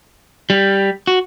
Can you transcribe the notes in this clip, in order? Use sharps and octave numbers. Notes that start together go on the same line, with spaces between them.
G3
F#4